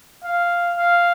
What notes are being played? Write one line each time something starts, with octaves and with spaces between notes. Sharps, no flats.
F5
F5